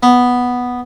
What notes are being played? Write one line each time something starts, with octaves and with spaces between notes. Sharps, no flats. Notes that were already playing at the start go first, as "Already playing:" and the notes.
B3